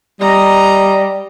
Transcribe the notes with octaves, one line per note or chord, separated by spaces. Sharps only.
G3 D#5 A#5